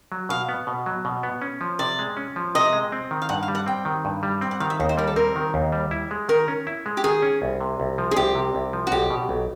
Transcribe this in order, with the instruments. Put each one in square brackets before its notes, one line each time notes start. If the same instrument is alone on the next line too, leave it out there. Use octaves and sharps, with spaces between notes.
[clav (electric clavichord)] F#3
[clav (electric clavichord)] B2 [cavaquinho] F5
[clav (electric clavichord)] B3
B2
F#3
B2
B3
C#4
F3
[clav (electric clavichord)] C3 [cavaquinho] D5
[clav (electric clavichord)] G#3
C#4
F3
[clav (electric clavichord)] C3 [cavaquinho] D#5
[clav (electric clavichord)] G#3
C4
D#3
[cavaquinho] F5
[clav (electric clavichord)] G2 [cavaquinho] F#5
[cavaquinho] F5
[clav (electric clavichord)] G3
[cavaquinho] F#5
[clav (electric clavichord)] C4 [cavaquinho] G5
[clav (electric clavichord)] D#3
G2
G3
[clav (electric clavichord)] C4 [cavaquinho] G5
[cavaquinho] F#5
[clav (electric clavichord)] D#3 [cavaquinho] F5
[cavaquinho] E5
[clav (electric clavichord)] D#2 [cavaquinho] D#5
[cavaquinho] C5
[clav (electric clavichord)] G3 [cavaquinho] A#4
[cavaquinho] A4
[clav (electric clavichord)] C4 [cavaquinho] A#4
[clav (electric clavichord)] D#3
D#2
G3
E4
G#3
[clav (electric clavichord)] D#3 [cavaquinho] A#4
[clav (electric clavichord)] C#4
E4
G#3
[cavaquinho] G4
[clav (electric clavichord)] D#3 [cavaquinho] G#4
[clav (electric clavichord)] C#4
C2
C3
C2
F3
[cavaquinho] G#4
[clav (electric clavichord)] C2 [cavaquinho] G4
[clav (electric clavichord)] C3
C2
F3
[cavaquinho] F#4
[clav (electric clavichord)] B1 [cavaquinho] G4
[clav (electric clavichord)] B2
B1